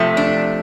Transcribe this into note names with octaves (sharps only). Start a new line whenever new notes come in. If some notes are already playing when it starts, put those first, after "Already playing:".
Already playing: C3 F3 A3
D4